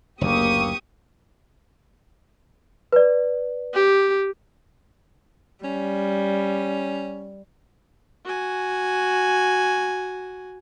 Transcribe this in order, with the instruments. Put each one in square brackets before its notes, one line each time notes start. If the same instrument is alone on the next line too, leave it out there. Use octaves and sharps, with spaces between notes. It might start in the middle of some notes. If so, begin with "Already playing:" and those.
[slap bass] F#1 D2 [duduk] A#3 [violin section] G4 C#6 D#6
[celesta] B4 D5
[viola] G4
[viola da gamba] G3 [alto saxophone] C#4
[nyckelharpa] F#4 G#5